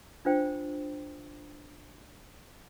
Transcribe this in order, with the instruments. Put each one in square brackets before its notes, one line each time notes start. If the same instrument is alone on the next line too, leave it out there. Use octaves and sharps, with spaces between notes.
[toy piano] D4 F4 C5 G5